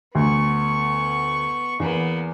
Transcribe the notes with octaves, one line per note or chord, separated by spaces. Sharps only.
D2 B3 C#6
E2 A#3 B3